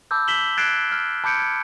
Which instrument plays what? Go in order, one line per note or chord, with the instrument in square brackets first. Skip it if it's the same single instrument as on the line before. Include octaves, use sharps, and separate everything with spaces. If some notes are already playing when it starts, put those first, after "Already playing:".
[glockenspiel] A5 B5 D6 E6 G6
B6 E7 F#7 G7
F#6 G#6 A6 C7 D7 E7
F6
A5 B5 D6 G6 C#7 D7
G#6 C#7